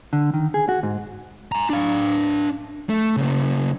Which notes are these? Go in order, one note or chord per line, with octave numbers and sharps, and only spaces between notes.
D3
D#3
G#4
F#4
G#2
G#5 A#5
D4 F5
A3
C#3 A#3